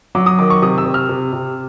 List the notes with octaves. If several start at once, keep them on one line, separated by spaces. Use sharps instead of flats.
F#3 D6
D#6
D#3 D6
C#6
C3 D#6
E6
C3
F6
C3
C3